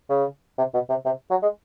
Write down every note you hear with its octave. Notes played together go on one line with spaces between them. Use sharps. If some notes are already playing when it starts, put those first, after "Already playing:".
C#3
C3
B2
C3
C3
F#3
G#3